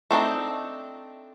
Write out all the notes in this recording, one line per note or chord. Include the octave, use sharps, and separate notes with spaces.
A3 C4 D4 D#4